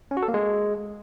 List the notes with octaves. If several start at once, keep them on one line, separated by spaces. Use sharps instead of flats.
C#4
F#4
A4
A#3
G#3